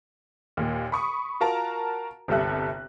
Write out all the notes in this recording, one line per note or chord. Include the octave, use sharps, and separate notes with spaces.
D#2 A#2
B5 C#6 D#6
F4 F#4 A#4 A5 A#5
G1 C2 G4 A4 E5 F#6